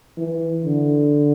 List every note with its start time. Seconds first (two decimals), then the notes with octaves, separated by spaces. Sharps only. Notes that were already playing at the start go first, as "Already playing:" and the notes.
0.17 E3
0.64 D3